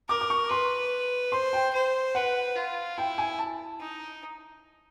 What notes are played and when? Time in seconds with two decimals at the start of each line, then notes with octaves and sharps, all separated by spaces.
0.09 A#4 D6
0.21 D6
0.30 C#6
0.50 B4 C6
1.32 C5 C6
1.53 G5
1.73 C5
2.15 B4 F#5
2.56 F4
2.97 E4 G5
3.18 G#5
3.39 A5
3.80 D#4